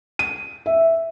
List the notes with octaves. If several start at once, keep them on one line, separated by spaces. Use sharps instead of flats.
D#7
E5